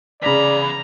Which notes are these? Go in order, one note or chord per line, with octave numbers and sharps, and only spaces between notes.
E2 C#3 D5 A#5 B5 B6